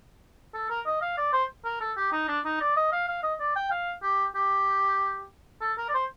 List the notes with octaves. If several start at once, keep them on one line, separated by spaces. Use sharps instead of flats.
A4
A#4
D#5
F5
D5
C5
A#4
A4
G4
D#4
D4
D#4
D5
D#5
F5
F5
D#5
D5
G5
F5
G4
G4
A4
A#4
D5
C5